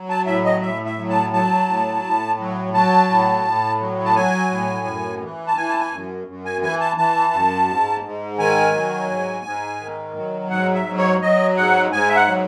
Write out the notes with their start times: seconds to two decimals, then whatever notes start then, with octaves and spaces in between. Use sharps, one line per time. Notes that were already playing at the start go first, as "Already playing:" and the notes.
Already playing: F#3
0.09 A5
0.26 A2 E5
0.45 D#5
0.62 A2 E5
0.86 E5
0.98 F#3
1.10 A5
1.33 F#3 A5
1.68 A2
2.03 A2
2.39 F#3
2.74 F#3 A5
3.09 A2
3.45 A2
3.80 F#3
4.05 A5
4.15 F#3 G#5
4.51 A2
4.86 F#2
5.22 E3
5.47 A5
5.57 E3 G#5
5.69 A5
5.80 G#5
5.92 F#2
6.27 F#2
6.45 G#5
6.63 E3 G#5
6.80 A5
6.98 E3 A5
7.33 F#2
7.69 G#2
8.04 G#2
8.39 D#3 G#5
8.74 F#3
9.10 G#2
9.45 G#2
9.80 D#3
10.16 F#3
10.51 G#2 F#5
10.75 E5
10.87 F#3
10.98 C#5
11.22 F#3 D#5
11.57 G#2 F#5
11.92 G#2 G#5
12.09 E5
12.16 F#5
12.28 F#3